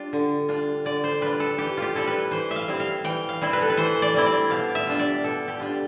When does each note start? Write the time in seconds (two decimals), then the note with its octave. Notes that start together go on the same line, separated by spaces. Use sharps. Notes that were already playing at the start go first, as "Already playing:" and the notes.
Already playing: G3 D4 F4
0.13 D3
0.48 G3 D4 F4
0.85 D3 D5
1.04 C5
1.21 G3 D4 F4 B4
1.40 A4
1.58 E3 G4
1.77 F4 G4
1.95 G3 C4 E4 A4
2.07 B4
2.31 E3 C5
2.51 E5
2.56 F5
2.68 G3 C4 E4
2.80 F5
3.04 E3 G5
3.29 F5
3.41 G3 C4 E4
3.53 B4
3.61 A4
3.70 B4
3.77 E3 C5
4.02 D5
4.14 G3 C4 E4
4.26 D5
4.50 B2 F5
4.75 E5
4.87 G3 D4 F4
4.99 D5
5.23 B2 A4
5.48 G4
5.60 G3 D4 F4